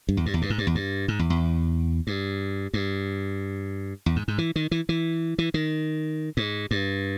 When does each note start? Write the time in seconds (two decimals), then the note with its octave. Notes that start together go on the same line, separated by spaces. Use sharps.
0.09 G2
0.17 E2
0.26 G2
0.34 E2
0.42 G2
0.50 G#2
0.58 G2
0.67 E2
0.75 G2
1.08 G#2
1.19 E2
1.30 E2
2.07 G2
2.74 G2
4.06 E2
4.16 G#2
4.28 G#2
4.38 E3
4.56 D#3
4.71 E3
4.89 E3
5.38 E3
5.54 D#3
6.37 G#2
6.71 G2